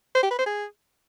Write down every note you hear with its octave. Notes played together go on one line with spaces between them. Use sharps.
C5
G4
B4
C5
G#4